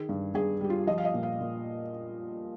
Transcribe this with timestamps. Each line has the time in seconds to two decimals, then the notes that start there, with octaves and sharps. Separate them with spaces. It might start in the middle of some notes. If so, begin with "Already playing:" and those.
Already playing: D#3 G#4
0.09 G2
0.34 G2 G#4
0.61 G3 G4
0.70 F4
0.87 F3 D#5
0.98 F5
1.05 D#5
1.14 A#2
1.23 F5
1.40 A#2